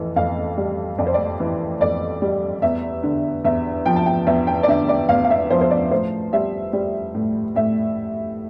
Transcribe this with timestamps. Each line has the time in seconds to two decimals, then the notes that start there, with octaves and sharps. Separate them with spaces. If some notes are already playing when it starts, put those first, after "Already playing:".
Already playing: F2 E3
0.16 F2 F5
0.58 G3
0.98 F2 D5
1.07 C5
1.14 D5
1.40 E3
1.81 F2 D5
2.22 G3
2.62 E2 E5
3.03 D3
3.45 E2 E5
3.86 F3 G5
3.96 A5
4.06 G5
4.27 E2 E5
4.47 G5
4.63 D5
4.68 D3 E5
4.89 D5
5.09 E2 F5
5.25 F5
5.30 E5
5.50 F3 C5
5.61 C5
5.71 D5
5.91 A2 C5
6.33 G3 E5
6.73 G3
7.14 A2
7.55 A2 E5